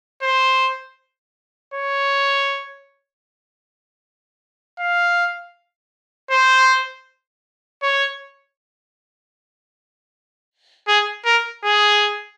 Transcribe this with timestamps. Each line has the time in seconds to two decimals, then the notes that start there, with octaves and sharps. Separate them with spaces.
0.22 C5
1.74 C#5
4.79 F5
6.31 C5
7.83 C#5
10.88 G#4
11.25 A#4
11.64 G#4